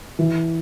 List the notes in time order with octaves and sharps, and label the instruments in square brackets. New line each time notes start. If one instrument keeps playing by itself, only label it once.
[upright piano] E3